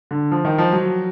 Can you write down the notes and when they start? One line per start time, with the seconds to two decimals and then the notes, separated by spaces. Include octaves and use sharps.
0.11 D3
0.31 F3
0.45 D#3
0.58 F3
0.72 F#3